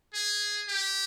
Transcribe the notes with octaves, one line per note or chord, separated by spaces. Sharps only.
G#4
G4